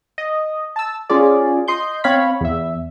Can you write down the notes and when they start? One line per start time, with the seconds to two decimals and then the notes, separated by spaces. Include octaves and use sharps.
0.18 D#5
0.76 A5 E6
1.10 C#4 F4 G#4 D5
1.68 D#5 C6 G6
2.04 C4 C#5 F5 B5
2.41 E2 E5